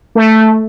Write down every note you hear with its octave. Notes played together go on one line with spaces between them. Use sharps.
A3